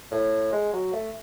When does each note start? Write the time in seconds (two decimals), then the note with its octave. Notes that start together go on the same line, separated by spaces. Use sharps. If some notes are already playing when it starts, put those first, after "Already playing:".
0.11 A2
0.53 G#3
0.73 F#3
0.93 A3